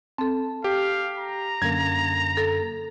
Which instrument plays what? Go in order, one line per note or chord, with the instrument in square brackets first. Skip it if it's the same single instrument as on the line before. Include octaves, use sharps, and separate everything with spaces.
[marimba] C4 A4 [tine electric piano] A5
[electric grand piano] G4 [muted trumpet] F5
[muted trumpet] A#5
[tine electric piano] F#2 D3 A#3 [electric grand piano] G#6
[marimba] A4